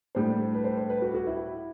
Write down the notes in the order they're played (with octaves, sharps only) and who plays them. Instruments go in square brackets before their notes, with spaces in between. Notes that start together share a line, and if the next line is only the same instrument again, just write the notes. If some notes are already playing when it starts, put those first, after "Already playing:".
[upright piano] A2 G3 D4 G4 [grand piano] C5
[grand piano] B4
C5
C5
B4
F#4
F#4
E4